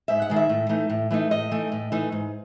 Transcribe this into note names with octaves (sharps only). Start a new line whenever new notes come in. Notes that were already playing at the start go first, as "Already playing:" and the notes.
G#2 E5
F#5
D#3 G#3
E5
A2
E3 A3 D#4
A2
E3 A3 D#4
A2 D#5
E3 A3 D#4
A2
E3 A3 D#4
G#2